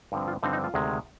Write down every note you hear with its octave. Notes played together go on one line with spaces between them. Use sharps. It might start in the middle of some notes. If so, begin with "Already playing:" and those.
G2 D3 F3 C4
F4
G2 D3 F3 C4 D#4
D#4
F4
D2 C3 D#3 G#3